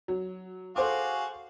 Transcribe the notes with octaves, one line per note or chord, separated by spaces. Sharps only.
F#3
F#4 G#4 A4 C5 F5 D6